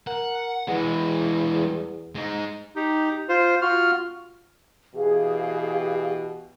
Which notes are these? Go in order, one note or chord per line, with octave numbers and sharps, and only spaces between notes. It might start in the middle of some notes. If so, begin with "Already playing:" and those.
A#4 F#5
E2 E3 G#3
G#3 D#4
D#4 G4
F4 C5
F4 F#4 F6
B2 E3 G4 G#4 F5